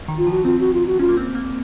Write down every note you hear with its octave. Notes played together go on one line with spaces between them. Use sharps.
D#3
F4
F3
F#4
C4 F4
F#4
F4
F#4
C#4 F4
A#3
C4
A#3